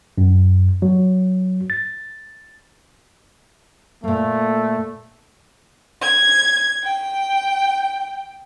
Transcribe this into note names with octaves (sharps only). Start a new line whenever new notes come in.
F#2
F#3
A6
A#2 A3 A#3
G#6
G5